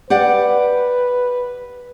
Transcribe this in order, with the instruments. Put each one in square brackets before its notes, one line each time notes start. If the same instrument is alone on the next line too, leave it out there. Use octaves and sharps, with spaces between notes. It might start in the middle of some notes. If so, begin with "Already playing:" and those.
[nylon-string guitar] G4 D5 F#5 [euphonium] B4